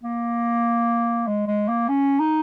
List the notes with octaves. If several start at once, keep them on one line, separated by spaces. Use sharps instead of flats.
A#3
G#3
G#3
A#3
C#4
D#4